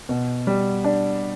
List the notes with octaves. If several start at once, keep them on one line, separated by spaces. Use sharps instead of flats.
B2
G3
D4